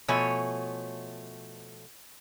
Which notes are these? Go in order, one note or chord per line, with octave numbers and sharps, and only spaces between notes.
B2 F3 A3 C#5 G#5